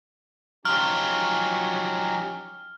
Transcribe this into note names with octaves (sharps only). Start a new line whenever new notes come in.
F3 F#3 C#4 D#4 G4 F6